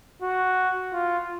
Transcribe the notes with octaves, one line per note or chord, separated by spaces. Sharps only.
F#4
F4